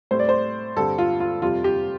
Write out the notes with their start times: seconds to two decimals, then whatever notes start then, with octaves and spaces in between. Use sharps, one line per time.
0.11 A2 G3 C4 C5
0.19 D5
0.29 C5
0.77 G2 D3 G3 C4 A4
0.98 F4
1.20 F4
1.42 F2 C3 G3 F4
1.64 G4